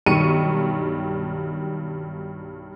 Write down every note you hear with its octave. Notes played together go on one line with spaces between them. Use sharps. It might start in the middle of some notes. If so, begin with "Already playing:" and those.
B1 G2 D#3 C#6 C#7 D#7